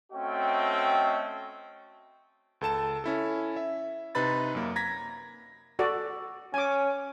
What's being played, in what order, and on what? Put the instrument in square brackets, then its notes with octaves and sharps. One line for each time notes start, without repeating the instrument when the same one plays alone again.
[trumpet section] A3 C4 C#4 F#4 D#5 G5
[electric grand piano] C#2 A4 A5 E7
C#4 E4 A4
E5
C3 D#4 B4 B5 A6
F#2 A#3
A#5 G#6 A#6 B6
[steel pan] F#4 A4 D5
[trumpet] C#4 [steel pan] G#5 D6